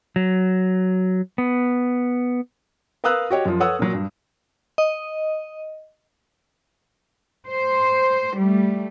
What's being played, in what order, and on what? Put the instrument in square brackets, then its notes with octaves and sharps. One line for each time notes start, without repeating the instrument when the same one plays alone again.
[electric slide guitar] F#3
B3
[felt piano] A#4 B4 F5 D#6 E6 F#6
F#4 G4 C#5 D#5
F#2 F3
A4 B4 C#5 F#5 D#6 E6
A#2 F#3
G2
[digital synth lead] D#5
[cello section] C5
G3 A3